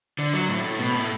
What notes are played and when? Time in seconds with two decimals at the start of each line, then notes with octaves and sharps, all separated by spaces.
0.19 D3
0.33 F#3
0.49 A2
0.64 A2
0.79 B2
0.94 A2